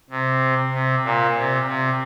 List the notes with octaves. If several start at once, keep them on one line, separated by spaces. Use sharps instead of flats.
C3
C3
A#2
C3
C3